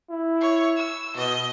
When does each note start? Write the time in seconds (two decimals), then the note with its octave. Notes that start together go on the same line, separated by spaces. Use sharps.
0.10 E4
0.41 C#5
0.77 E6
1.16 B2 D#5